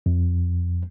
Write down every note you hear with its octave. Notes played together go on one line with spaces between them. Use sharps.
F2